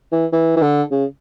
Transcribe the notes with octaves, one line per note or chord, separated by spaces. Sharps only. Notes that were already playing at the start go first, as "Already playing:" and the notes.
E3
E3
E3
D3
C#3